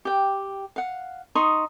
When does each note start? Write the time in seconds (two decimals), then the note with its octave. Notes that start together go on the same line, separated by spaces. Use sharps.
0.05 G4 G5
0.76 F5 F#5
1.35 D#4 C6 C#6 D#6